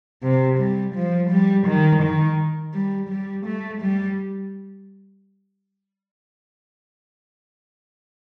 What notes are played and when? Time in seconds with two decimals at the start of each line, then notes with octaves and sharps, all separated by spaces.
0.23 C3
0.59 G3
0.95 F3
1.30 G3
1.67 D#3
2.02 D#3
2.74 G3
3.10 G3
3.46 A3
3.81 G3